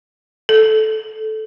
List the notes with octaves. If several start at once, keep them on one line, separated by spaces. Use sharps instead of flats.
A4